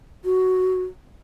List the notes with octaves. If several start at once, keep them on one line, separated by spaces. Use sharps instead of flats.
F#4